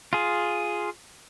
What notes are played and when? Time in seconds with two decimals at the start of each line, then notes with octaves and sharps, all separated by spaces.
0.13 F4 G#4